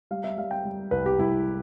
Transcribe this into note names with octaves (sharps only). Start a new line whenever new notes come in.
G3 F5
E5
G3 F5
G5
G3
C2 B4
G4
C2 E4